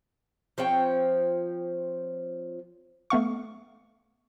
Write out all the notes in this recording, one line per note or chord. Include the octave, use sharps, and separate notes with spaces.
F3 C4 C#5 G5
A3 B3 F5 C#6